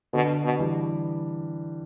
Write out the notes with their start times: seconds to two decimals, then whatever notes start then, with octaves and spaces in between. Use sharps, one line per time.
0.13 B2 D3
0.45 B2
0.59 E3 G3